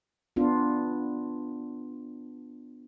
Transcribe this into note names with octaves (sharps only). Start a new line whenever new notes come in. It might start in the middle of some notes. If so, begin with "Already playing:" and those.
B3 D4 F4